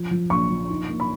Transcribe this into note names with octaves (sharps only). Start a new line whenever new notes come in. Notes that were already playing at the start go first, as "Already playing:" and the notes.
Already playing: F3 F4
F3
A#1 C#6
F3
D#4
A#3
B5